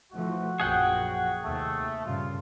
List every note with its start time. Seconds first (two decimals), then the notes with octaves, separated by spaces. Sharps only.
0.13 E3 F3 A3 F#4
0.60 A#1 F#2 F3 G#4 F#5 G5
1.42 D#2 C3 A3
2.04 G2 A#2 C#3 F4